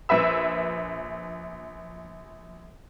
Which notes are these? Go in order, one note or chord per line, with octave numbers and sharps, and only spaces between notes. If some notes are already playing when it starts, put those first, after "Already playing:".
A#1 B4 E5 E6